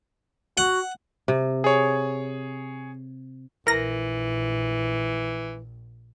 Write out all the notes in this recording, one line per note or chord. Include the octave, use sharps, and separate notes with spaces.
F#4 F#5
C3
G#4 C#5
A#1 E3 A#4 A#6